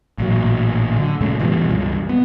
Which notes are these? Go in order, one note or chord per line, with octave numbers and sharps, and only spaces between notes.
A1 A#2 F#3
D3
D#1 G#2 C#3 A3
B2 E3 F3 G3
C#2 G2
B3